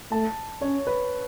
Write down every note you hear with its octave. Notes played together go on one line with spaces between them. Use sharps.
A3 A5
C#4 C#5
B4